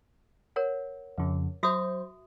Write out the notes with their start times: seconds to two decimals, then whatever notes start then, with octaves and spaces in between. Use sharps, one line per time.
0.56 A#4 C#5 F#5
1.18 F2 C#3
1.63 F#3 F#4 C5 E5 D#6